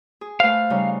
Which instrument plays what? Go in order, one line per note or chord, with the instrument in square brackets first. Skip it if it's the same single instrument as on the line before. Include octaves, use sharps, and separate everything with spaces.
[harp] G#4
[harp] A3 B4 C5 [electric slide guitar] F5
[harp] C#3 G3 D#4